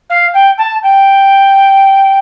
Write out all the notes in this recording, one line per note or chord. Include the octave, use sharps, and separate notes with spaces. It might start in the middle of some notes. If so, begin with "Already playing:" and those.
F5
G5
A5
G5